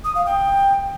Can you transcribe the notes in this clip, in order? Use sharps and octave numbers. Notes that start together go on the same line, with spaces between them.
D#6
F5
G5